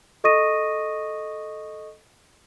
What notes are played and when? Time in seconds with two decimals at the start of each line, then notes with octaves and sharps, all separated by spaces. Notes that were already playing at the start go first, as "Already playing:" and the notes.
0.24 A4 D#5 C#6 D#6 A#6 D#7